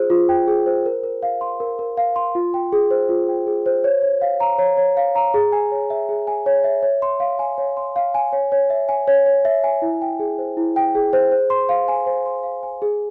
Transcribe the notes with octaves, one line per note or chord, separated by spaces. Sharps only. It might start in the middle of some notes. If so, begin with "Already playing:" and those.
Already playing: F4 G#4 C5
F4
G5
G#4
C5
A#4
A#4
F5
C6
A#4
A#4
F5
C6
F4
G5
G#4
C5
F4
G5
G#4
C5
C#5
C#5
F5
A#5
C#5
C#5
F5
A#5
G#4
G#5
C#5
E5
G#4
G#5
C#5
E5
C#5
C6
F5
G#5
C#5
C6
F5
G#5
C#5
C#5
E5
G#5
C#5
C#5
E5
G#5
E4
G5
G#4
C5
E4
G5
G#4
C5
C5
C6
F5
G#5
C5
C6
F5
G#5
G#4